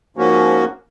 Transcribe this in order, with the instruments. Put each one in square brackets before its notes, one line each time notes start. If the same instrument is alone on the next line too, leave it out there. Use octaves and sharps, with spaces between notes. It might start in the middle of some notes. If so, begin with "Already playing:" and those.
[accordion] G#2 F3 A#3 C#4 F#4